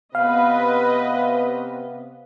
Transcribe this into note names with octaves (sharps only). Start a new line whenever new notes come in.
C3 B3 B4 D#5 F5